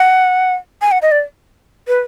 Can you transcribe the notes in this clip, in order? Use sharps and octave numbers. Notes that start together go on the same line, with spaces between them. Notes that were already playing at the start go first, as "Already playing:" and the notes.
Already playing: F#5
G#5
F#5
D#5
D5
B4